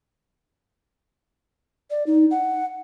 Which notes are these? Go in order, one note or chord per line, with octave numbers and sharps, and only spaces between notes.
D5
D#4
F#5